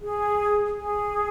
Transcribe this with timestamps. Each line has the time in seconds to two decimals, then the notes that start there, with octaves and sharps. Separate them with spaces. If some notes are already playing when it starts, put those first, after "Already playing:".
0.02 G#4
0.78 G#4